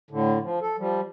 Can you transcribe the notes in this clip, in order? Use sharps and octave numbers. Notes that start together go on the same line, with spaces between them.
A2 D3
F3
A4
F3 G3